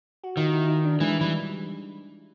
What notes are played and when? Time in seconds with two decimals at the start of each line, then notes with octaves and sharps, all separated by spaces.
0.24 F#4
0.37 D#3 F4
0.52 E4
0.68 D#4
0.85 D4
1.00 E3 G#3
1.21 E3 G3